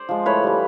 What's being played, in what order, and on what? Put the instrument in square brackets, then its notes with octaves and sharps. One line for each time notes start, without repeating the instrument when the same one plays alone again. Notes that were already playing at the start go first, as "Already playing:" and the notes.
Already playing: [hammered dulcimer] C5 D5
F3 G#3
A2 B4 C#5
E3 G3